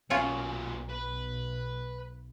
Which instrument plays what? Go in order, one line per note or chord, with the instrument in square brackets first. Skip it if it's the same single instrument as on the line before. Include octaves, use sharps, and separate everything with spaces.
[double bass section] B1 [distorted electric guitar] A#2 B3 [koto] C#4 F4 C#5
[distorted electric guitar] B4